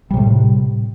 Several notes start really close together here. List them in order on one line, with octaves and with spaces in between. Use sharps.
G3 C3 A2